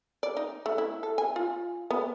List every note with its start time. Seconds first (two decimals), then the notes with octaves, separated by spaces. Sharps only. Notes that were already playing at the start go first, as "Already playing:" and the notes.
0.23 D5
0.37 D#4
0.66 A3
0.78 E4
1.03 A4
1.18 G#5
1.36 F4
1.91 B3